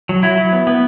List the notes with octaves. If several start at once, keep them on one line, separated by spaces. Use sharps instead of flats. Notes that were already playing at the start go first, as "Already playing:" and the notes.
F#3
F#3 E4
F#3
B3
B3